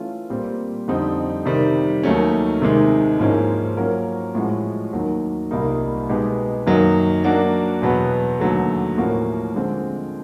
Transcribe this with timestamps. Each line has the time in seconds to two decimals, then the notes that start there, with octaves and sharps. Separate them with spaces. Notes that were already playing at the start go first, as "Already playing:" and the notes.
Already playing: E3 A3 C#4 F4
0.30 A#2 G3 C4
0.88 F2 D3 G3 C4 D#4
1.45 C3 D#3 G3
2.03 D#2 D#3 F#3 A3 C#4
2.61 C3 D#3 G#3
3.19 G#2 F3 A#3 C#4 E4
3.77 F#3 A#3 C#4 F4 A#4
4.35 A2 F3 G#3 C#4 F#4
4.93 D#2 D#3 F#3
5.51 C2 A#2 G3 A#3 D#4
6.09 B2 G#3 B3 D#4 G4
6.66 F#2 D#3 F#3 A#3 D#4
7.24 F#3 A#3 D4 F#4
7.82 E2 B2 F#3 B3
8.40 D#2 D3 F#3 A3
8.98 A2 F3 A#3 C#4 F#4
9.56 D3 F3 G#3 C4